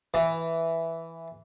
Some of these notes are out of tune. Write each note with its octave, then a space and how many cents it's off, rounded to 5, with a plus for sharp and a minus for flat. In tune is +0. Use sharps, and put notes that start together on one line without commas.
E3 +0